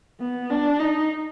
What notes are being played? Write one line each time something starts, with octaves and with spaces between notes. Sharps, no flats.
B3
D4
D#4